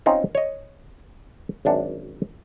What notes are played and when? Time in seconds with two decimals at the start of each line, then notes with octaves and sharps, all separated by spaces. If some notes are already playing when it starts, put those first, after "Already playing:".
0.06 C4 C#4 D#4 F4
0.35 C#5 D#5
1.65 G#1 F#2 D4 F#5